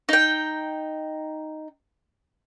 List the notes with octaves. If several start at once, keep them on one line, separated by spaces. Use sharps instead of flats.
D#4 G5